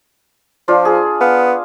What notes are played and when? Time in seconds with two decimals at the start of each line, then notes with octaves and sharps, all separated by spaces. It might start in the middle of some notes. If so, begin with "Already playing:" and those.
0.68 F3 D4 F4
0.85 G#4
1.21 B3 F5